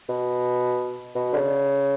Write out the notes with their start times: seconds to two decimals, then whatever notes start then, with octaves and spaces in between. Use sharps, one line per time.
0.09 B2
1.15 B2
1.33 D3
1.36 C#3